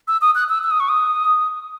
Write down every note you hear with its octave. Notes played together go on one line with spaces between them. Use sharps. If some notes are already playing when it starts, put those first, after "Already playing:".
E6
D#6
F#6
E6
E6
D#6
C#6
D#6